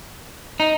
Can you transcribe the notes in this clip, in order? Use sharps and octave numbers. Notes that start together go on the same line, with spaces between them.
D#4